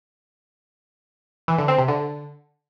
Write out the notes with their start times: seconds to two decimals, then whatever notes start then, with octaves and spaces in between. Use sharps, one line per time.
1.48 E3
1.58 D3
1.68 C4
1.78 C3
1.88 D3